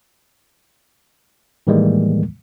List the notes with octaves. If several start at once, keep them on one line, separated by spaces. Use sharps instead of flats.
A2 D#3 E3 G3 G#3 A#3